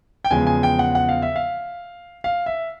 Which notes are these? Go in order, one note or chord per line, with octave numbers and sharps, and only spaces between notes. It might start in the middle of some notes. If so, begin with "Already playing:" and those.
G5
E2 C#3 F3 G#3 G#5
G#5
G5
F#5
F#5
F5
E5
F5
F5
E5